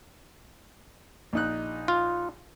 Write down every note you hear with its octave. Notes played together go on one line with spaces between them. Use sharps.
A#1 D#4 F#6
F4